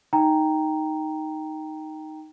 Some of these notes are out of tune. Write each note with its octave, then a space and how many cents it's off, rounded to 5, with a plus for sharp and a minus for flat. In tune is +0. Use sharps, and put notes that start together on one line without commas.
D#4 +0 G5 +0 A#5 +0